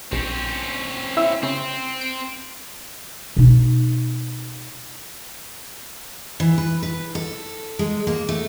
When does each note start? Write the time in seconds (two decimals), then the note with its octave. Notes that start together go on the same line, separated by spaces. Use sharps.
0.12 A#1 C4 C#4
1.17 E4 E5
1.43 C#3 C4
2.01 D7
3.36 B2 D#4
6.40 E3
6.58 B4
6.83 B4
7.15 A4
7.79 G#3
8.07 A#3
8.29 A3